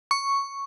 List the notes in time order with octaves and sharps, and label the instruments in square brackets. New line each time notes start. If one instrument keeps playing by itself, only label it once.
[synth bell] C#6